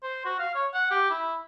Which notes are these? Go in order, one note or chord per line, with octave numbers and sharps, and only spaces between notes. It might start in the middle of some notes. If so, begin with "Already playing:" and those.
C5
F#4
F5
C#5
F#5
G4
E4